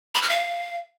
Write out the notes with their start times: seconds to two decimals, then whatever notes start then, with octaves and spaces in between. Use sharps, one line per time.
0.15 B5
0.22 F6
0.30 F5